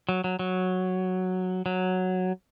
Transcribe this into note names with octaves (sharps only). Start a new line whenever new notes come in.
F#3
F#3
F#3
F#3